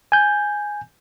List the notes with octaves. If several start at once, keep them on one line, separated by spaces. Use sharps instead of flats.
G#5 G6